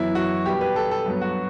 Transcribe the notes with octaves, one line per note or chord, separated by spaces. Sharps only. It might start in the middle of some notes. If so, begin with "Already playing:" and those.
Already playing: F#2 E3 B3 E4
F#4
B2 G3 B3 G4
B4
A4
A4
G2 F#3 B3
F#4